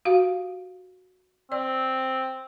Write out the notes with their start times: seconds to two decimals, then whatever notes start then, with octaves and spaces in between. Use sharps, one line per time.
0.05 F#4 G4 F5
1.52 C4 D5